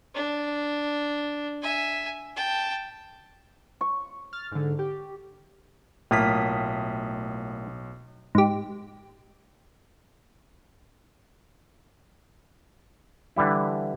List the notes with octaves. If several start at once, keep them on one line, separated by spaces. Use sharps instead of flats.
D4
E5 G#5
G5 A5
C#6
F6 A6
G#2 D3
G4
B1 A2 A#3 F4 D#6 B6
G#2 G4
D3 E3 G3 E4